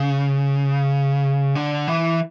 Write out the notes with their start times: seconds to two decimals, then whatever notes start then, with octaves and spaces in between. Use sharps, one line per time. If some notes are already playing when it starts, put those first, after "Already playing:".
Already playing: C#3
1.55 D3
1.88 E3